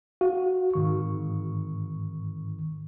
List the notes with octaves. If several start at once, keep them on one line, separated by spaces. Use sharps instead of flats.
F#4 F5
G#2 D#3 C#6